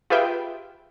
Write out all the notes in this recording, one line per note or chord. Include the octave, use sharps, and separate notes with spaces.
F4 G4 G#4 B4 E5 G5